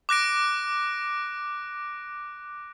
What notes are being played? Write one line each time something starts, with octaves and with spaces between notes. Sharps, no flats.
D6 F#6 A#6 D7